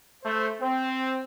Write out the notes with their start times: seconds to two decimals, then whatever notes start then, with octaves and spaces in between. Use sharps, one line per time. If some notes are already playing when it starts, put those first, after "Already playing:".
0.24 A3 C5
0.61 C4